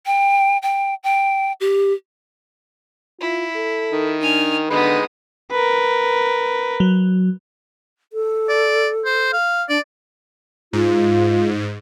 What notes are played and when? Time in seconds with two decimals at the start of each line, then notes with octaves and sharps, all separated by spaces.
0.06 G5
0.62 G5
1.04 G5
1.60 G4
3.20 E4 F4
3.55 A4
3.92 D#3
4.21 D4 G#5 F6
4.70 D3 G#3 B3 D#4 B4 D#6
5.51 A#4 B4
6.80 F#3
8.13 A4
8.48 D5
9.05 C5
9.33 F5
9.69 D4 D5
10.73 G#2 F4